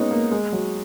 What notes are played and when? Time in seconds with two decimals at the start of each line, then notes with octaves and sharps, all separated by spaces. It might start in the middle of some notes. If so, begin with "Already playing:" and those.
Already playing: G#3 A#3 B3 C#4 D#4
0.11 A#3
0.32 G#3
0.52 F#3